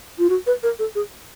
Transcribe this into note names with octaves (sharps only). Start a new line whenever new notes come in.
F4
F#4
B4
A#4
A4
G#4